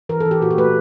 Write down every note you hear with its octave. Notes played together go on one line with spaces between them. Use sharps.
E3 A#4
A4
E3
G4
A#2 F#4
G4
A3 B4